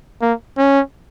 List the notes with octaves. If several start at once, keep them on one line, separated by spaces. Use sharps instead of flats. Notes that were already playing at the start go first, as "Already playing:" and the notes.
A#3
C#4